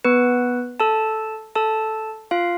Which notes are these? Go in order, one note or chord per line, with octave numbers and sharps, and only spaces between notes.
B3 B4
A4 A5
A4 A5
F4 F5